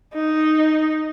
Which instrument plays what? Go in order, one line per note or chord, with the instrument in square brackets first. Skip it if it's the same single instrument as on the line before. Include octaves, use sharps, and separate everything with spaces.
[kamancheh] D#4